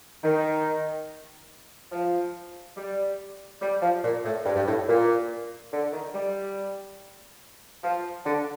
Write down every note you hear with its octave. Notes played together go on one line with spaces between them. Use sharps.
D#3
F3
G3
G3
F3
A#2
A2
G2
G2
A2
A#2
D3
D#3
G3
F3
D3